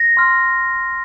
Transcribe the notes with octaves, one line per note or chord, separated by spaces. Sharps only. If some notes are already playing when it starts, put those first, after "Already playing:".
Already playing: A#6
C6 F6